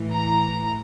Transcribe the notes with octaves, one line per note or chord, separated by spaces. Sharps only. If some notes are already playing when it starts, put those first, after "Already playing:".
Already playing: A2 E3
A#5